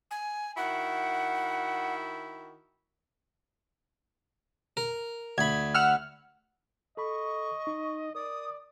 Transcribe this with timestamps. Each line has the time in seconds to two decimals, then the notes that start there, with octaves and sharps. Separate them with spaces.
0.11 G#5
0.57 D#3 E4 F#4 F#5
4.77 A#4
5.38 D2 B5 G#6
5.75 F#5 E6 F6
6.97 A4 D#5 B5 C#6
7.67 D#4
8.15 A#4 D5 D#6